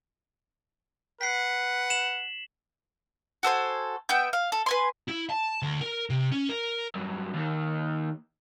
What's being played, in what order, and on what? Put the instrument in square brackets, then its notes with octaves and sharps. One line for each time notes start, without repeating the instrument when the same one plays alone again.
[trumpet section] B4 F#5 [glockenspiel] B6 C7
[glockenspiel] E7 F#7
[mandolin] F#4 A4 C5 G#5
B3 E5 G5 G6
F5
A4
B4 G#5 C6
[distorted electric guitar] E4
A5
D2
A#4
C3
C#4
A#4
[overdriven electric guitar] G2 F#3
D#2 D#3